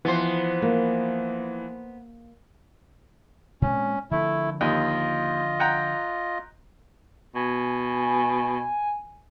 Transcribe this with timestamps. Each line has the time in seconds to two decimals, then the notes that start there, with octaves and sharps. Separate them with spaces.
0.05 E3 F3 B3 C5
0.62 A#3
3.62 A#2 G#3 C4 C#4
4.11 D3 F3 A3 E4
4.61 D#2 F4 D#5
5.60 F#5 G5 A#5
7.35 B2 G#5